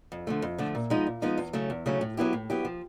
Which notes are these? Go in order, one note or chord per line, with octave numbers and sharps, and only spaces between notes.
F2
D3 F3 A3
F2
D3 F3 A3
A#2
F3 G#3 B3 D#4
A#2
F3 G#3 B3 D#4
E2
C#3 F#3 A3 C#4
E2
C#3 F#3 A3 C#4
A2
F#3 B3 E4 G4
A2
F#3 B3 E4 G4
F3